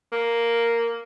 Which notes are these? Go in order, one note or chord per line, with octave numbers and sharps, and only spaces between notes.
A#3